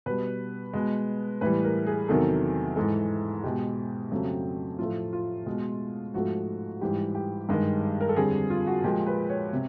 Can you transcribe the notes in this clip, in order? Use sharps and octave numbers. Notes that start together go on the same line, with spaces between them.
B2 G3 B4
B2 G#3
A2 E3 G3 B4
A#4
G#4
E2 C3 D#3 F#3 A4
G#2 E3 G#3 A4
B2 G#3 G4
F2 C#3 F#3 A3
A2 F3 A3 F4
F4
B2 G#3
G#2 F3 A3 F#4
G#2 E3 G3 G4
G4
G2 D#3 G#3
A#4
A4
F2 D3 G3 G#4
F4
F#4
A#2 F3 G#3 G4
B4
C#5
C3